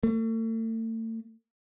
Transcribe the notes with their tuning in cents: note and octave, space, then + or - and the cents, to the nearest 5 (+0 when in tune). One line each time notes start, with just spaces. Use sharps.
A3 +40